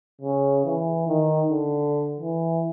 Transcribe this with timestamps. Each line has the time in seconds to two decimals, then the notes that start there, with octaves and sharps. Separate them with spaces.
0.21 C#3
0.65 E3
1.07 D#3
1.51 D3
2.20 E3